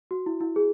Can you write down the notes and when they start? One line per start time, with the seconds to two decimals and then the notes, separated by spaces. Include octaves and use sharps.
0.11 F#4
0.26 E4
0.41 E4
0.56 G#4